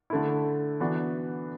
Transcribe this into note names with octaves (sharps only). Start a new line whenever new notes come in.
D3 A3 E4
E3 B3 D4 F#4